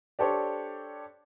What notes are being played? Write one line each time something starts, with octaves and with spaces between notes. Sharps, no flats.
D4 G4 A4 C5 C#5